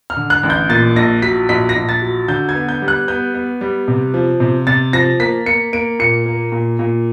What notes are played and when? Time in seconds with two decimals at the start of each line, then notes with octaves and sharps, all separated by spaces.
0.10 F6
0.17 D3
0.30 F#6
0.43 A1
0.50 G6
0.69 A#2 A6
0.96 A#1 A#6
1.22 F#3 B6
1.49 A#1 B6
1.69 A#6
1.76 A#1
1.89 A6
2.02 F#3
2.28 D3 G6
2.49 G#6
2.55 B3
2.69 G6
2.82 G3
2.88 F#6
3.08 B3 G6
3.34 B3
3.61 G3
3.88 C3
4.14 F3
4.40 C3
4.67 C3 A6
4.93 F3 A#6
5.20 A#3 B6
5.46 A#3 C#7
5.73 A#3 D7
5.99 A#2 C#7
6.26 A#3
6.52 A#2
6.79 A#2